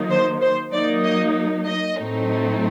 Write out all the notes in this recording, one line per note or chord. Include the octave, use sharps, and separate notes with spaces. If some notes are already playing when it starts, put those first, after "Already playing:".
Already playing: D#3 F#3 A#3 D#4
C5
C5
F#3 A#3 D#4 D5
D#5
D#5
A2 F#3 A3 C4 D#4